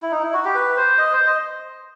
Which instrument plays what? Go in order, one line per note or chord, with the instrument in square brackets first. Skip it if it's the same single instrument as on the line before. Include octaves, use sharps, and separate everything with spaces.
[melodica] E4
D#4
E4
F#4
G4
B4
C5
D#5
C5
D#5